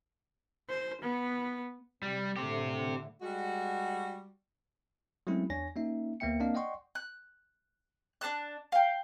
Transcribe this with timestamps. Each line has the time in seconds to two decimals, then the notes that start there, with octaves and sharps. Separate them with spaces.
0.69 C5
1.02 B3
2.03 C3 G3
2.37 A2 D3 A3 C4 G4
3.22 G3 G#3 F#4
5.27 F#3 G#3 A3 C4 C#4 E4
5.50 E2 D4 C#5 G#5 A#6
5.76 A#3 C#4 D#4 E5
6.20 D2 A#3 B3 E5 G5 C#7
6.39 A#3 C4 D4 D#5 F5
6.54 D5 D#5 F#5 G5 C6 C#6
6.95 F#6
8.21 D4 F5 A5 F#6
8.72 F5 G5